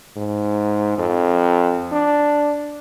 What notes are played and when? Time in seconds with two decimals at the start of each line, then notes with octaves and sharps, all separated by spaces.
0.16 G#2
0.98 F2
1.92 D4